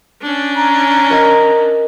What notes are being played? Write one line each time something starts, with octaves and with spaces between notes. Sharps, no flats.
C#4 D4
A#5
A#4 D#5